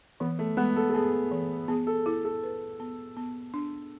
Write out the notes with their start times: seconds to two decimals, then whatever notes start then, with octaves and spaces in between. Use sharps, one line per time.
0.20 E3 B3
0.39 A3
0.57 G#3 B3
0.76 A4
0.90 A4
0.94 B3 G#4
1.31 E3
1.68 B3 G#4
1.87 A4
2.06 E4 A4
2.25 A4
2.43 B4
2.80 B3
3.17 B3
3.54 D4